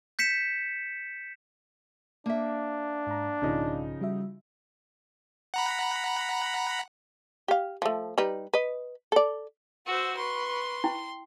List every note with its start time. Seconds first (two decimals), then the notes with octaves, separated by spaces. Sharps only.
0.19 G6 B6 C#7 E7
2.26 A#3 D4 E5
3.07 G#2 A#5
3.42 B1 G#2 C#3 F3 D#4
4.01 G3 F#4 E5
5.54 F#5 A#5 B5
7.48 G4 F5
7.82 F3 A3
8.18 G3 D#4 B4
8.53 B4 D#5
9.12 A4 D5
9.86 F#4 C5 F#5 E6
10.16 B4 C6 C#6
10.84 E4 G5